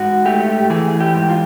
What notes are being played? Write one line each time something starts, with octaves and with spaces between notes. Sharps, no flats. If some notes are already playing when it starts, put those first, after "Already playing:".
Already playing: G#2 F#4
A3 G4
E3 G#4
G4
G#2
F4